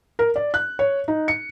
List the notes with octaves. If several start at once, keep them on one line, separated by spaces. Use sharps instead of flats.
A#4
D5
F#6
C#5
D#4
C#7